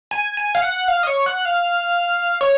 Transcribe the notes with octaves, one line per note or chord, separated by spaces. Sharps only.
G#5
G#5
F5
F#5
F5
D#5
C#5
F#5
F5
C#5